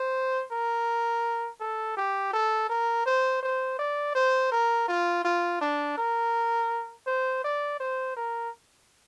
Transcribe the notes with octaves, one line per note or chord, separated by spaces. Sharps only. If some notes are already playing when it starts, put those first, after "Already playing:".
Already playing: C5
A#4
A4
G4
A4
A#4
C5
C5
D5
C5
A#4
F4
F4
D4
A#4
C5
D5
C5
A#4